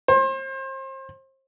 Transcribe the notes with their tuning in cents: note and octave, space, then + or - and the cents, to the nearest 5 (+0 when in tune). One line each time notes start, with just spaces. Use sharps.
C5 +35